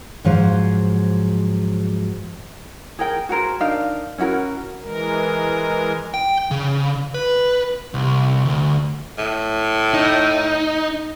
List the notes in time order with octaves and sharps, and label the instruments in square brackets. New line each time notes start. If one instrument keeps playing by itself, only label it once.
[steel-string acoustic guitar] G#2 F3 F#3 C5
[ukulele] G#4 A#4 G5
F#4 G#4 A#4 C5
D4 D#4 A#4 F5
C#4 E4 F#4 A#4
[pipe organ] E3 G#3 A#4
[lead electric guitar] G5
C#3
B4
C2
D2
[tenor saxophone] A2
[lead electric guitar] D#4